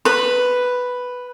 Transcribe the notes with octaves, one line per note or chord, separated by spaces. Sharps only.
B4 B5